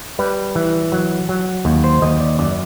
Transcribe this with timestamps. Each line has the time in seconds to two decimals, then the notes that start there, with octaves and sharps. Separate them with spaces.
0.19 G3 B4
0.55 E3
0.92 F#3
1.29 F#3
1.65 D#2
1.84 C5
2.02 D#2 D#5
2.20 D5
2.39 F#2 D5